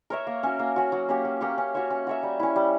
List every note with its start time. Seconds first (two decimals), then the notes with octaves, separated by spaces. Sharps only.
0.10 A#4 C#5 E5
0.27 A#3
0.43 C#4 F#4
0.59 A#3
0.76 C#4 F#4
0.92 F#3
1.09 A#3 C#4 G4
1.25 F#3
1.41 A#3 C#4 G4
1.58 C#4
1.74 F#4 C#5 E5
1.90 C#4
2.07 F#4 C#5 E5
2.23 G3
2.40 C#4 E4
2.56 G3